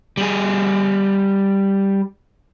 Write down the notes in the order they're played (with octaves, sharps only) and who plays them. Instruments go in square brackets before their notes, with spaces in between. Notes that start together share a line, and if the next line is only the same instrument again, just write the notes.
[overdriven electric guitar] G3 G#4